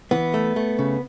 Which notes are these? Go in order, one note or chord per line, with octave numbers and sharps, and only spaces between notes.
E3 B3
A3
A3
C#3